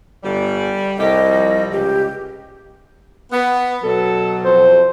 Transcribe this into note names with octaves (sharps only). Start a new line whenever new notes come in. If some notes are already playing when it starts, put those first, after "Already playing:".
G1 G3
C2 A2 A3 G4 D#5
F3 G3
C#2 G4
B3
B2 F#3 A4
F2 C5